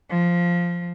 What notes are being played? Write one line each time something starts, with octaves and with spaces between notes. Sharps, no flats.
F3